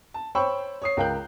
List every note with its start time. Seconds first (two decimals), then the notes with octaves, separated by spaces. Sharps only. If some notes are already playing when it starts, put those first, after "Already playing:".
0.14 A5
0.35 C5 C#5 G5 B5 C#6 E6
0.82 C#5 D#6 C7
0.97 C#2 A#4 F5 G5 F#6 G6